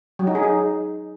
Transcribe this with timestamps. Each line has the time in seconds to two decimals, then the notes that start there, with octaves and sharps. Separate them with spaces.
0.19 F#3
0.27 D#4
0.35 G#4
0.43 D#4